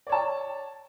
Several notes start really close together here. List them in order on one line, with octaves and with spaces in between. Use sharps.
D5 C#5 A5